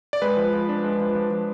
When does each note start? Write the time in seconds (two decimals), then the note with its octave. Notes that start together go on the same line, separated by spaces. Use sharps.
0.13 D5
0.22 G#3 B4
0.37 F3
0.53 F3
0.69 D4
0.84 G#3
1.00 F3
1.15 F3
1.31 F3